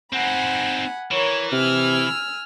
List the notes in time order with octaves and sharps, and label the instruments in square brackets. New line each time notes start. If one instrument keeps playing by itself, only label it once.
[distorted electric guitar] C4 D#4 [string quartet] F#5 G#5 B5
[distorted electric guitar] E3 [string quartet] A#4 C#5
[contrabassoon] C3 [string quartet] G#5 E6 F6